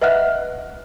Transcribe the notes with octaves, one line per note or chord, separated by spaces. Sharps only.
B4 D#5 E5 F#5 F6 F#6